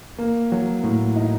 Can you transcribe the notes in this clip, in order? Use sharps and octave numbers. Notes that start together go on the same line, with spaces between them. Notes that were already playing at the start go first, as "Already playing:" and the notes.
A#3
F#3
A2
D#4